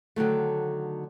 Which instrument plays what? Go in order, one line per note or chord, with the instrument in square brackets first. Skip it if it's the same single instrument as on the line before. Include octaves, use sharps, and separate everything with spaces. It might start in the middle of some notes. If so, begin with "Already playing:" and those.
[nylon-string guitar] D3 D#3 F#3 A3